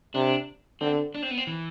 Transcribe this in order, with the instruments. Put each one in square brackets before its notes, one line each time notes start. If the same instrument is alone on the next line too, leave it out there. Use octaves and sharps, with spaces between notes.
[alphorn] C3 [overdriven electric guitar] D4
[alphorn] D3 [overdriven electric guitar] C4
[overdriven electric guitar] D4
C4
B3
C4
E3